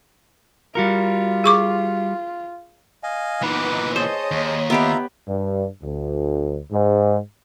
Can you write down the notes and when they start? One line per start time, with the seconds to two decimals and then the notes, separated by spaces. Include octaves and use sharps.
0.75 G3 F4 F#4 A#4
1.44 G#4 C#6 D6
3.03 D#5 F5 G#5
3.42 A#2 E3 B3 D#4 B4 D6
3.96 G#4 C5 C#5 D#5 A5
4.31 D#2
4.70 B3 F4 G4 B4 E5 A#5
5.27 G2
5.83 D2
6.71 G#2